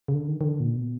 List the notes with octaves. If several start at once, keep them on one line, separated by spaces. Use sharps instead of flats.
C#3
D3
D#3
D#3
D3
A#2
B2